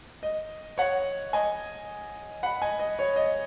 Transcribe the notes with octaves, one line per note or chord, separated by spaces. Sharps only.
D#5
C#5 F#5
D#5 G#5
F#5 B5
D#5 G#5
D#5
C#5
D#5